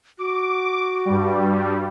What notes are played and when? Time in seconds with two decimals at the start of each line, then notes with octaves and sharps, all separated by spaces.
0.19 F#4 D6
1.05 G2 G3